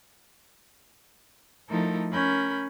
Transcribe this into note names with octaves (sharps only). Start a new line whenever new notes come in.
F3 A3 D#4 E4 A4 A#4
C#4 A#4 B5 G6